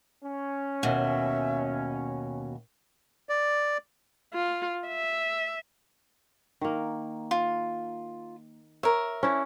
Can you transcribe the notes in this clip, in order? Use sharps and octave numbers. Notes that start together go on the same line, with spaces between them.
C#4
D#2 B2 E5
D5
F4
E5
D#3 A#3
F4
A#4 C#5 E5
C#4 D4 E4